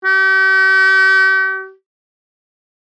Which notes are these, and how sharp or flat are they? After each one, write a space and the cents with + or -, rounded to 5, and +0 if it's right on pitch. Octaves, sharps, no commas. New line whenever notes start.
G4 -45